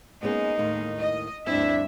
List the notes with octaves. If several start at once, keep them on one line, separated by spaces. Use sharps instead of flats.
G#3 A#3 B3 C#4 D#4 G#4
D#2 A2 D#3
D#5
D2 G2 C4 D4 E4 E5